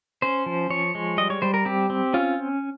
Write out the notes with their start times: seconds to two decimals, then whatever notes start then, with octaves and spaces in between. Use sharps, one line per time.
0.22 C#4 C5
0.46 F3
0.70 F3 C#5
0.95 G#3
1.18 G3 D#5
1.30 C#5
1.42 G3 C5
1.54 A#4
1.65 C4 G4
1.90 C4
2.14 C#4 F4